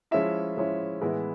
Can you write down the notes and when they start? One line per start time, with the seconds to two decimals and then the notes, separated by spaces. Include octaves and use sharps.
0.11 F3 G#3 C#4 E4 E5
0.57 F3 G#3 C#4 E4
1.01 A2 E3 G#3 B3 E4